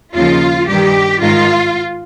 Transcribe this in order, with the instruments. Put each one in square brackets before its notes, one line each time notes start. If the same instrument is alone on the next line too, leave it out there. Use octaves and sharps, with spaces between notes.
[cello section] D#2 C#3 F3 F4
G2 D#3 G4
G#2 D#3 F4